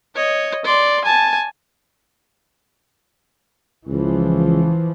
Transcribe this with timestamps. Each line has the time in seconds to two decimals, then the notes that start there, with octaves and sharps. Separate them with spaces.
0.15 C#5 D#5
0.65 D5 C6
1.04 G#5 A5
3.88 C#2 E3 F3